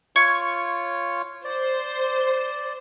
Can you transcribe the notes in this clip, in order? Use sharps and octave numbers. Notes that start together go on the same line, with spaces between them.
F4 C#5 C#6 G#6 C#7
C5 D5